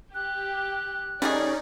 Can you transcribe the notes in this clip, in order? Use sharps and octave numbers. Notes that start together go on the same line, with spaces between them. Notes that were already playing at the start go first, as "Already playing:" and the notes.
G4 F#6
G3 A3 C#4 D#4 G#4 D5